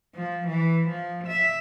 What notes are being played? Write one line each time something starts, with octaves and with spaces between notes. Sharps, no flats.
F3
E3
F3
E5